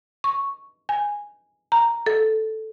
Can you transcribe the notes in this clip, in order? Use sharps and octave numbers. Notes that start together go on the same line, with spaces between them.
C#6
G#5
A#5
A4